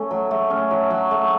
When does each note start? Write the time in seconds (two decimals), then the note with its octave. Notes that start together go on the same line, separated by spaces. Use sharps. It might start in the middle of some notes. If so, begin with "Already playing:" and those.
Already playing: A3 C#4
0.11 F#3
0.31 A3
0.50 C#4
0.71 F#3
0.91 F#3
1.11 A3